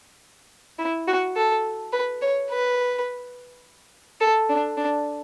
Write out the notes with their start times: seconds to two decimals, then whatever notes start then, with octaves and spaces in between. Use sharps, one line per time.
0.79 E4
1.07 F#4
1.36 A4
1.92 B4
2.21 C#5
2.50 B4
4.20 A4
4.49 D4
4.77 D4